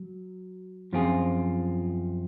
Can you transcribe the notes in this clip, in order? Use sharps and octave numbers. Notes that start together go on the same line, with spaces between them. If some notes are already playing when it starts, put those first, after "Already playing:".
Already playing: F#3
F#2 F3 C4 F4 G#4